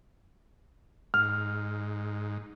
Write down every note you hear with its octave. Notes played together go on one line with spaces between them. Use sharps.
G#2 F6